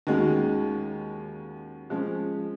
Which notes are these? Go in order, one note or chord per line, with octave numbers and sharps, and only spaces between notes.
D#2 D#3 G#3 C#4 F#4
F3 G#3 C#4